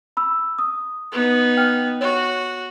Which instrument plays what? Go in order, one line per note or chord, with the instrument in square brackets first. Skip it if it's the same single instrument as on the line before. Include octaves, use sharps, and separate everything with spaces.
[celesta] B5 E6
D#6
[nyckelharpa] B3 D#4
[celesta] G5 F6
[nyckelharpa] F#4 [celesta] C#5